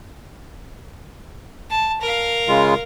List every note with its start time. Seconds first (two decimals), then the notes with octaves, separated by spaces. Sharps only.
1.70 A5
2.01 A#4 F5
2.48 C#3 G#3 F4